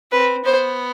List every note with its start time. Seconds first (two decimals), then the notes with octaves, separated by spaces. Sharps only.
0.12 C4 B4
0.45 B3 C5